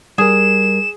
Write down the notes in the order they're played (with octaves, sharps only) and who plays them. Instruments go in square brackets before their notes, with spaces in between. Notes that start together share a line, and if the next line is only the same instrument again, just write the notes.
[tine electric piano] G3 A#4 [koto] G#4 [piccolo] E7